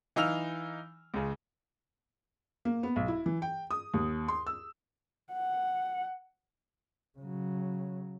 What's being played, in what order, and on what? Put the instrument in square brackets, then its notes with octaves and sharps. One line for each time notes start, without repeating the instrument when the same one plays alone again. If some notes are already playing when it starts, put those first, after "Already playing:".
[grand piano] E3 D#4 F5 E6 F6 F7
C#2 C#3
[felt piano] A#3
B3
B1
E4
E3
G5
D#6
D#2
C6
E6
[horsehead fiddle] F#5
[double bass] C#3 F#3